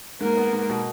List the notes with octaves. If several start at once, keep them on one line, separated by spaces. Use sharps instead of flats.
G#2 A#3 A#4
B3
G#2
B2